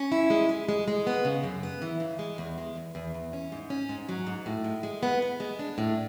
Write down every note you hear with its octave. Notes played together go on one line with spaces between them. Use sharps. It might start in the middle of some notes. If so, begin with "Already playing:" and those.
Already playing: C#4
E4
G#3
G#3
G#3
G#3
B3
C#3
F#2
B3
E3
C#3
G#3
E2
G#3
E2
E2
E2
C#4
G#2
C#4
G#2
F#3
G#2
A2
G#3
G#3
B3
B3
G#3
D4
A2